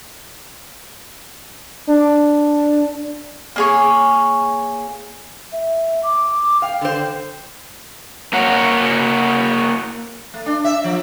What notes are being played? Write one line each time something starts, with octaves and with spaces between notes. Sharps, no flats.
D4
A#3 G#4 C#5
E5
D6
F5 G5
D3 C5
A#3 F#4 C#5
A3
D4
E5
F3